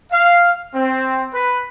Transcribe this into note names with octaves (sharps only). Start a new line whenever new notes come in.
F5
C4
B4